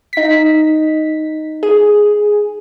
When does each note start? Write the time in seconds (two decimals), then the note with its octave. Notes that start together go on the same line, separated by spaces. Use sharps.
0.13 D#4 B6
1.63 G#4